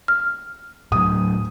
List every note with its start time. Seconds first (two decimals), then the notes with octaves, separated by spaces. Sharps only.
0.08 F6
0.92 A2 F#3 D#6